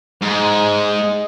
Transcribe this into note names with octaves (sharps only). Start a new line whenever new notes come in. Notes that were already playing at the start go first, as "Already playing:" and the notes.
G#2 G#3